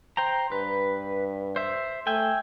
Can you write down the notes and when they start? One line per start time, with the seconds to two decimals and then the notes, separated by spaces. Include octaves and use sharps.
0.17 C5 G5 A#5
0.52 G2 B4
1.56 C5 E5
2.07 A3 E5 G5 G#5